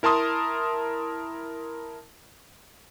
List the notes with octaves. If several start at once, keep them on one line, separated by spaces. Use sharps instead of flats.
E4 A#4 A5 C6 D#6